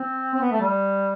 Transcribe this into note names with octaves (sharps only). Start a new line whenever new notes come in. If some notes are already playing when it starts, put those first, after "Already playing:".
Already playing: C4
C4
B3
A3
G3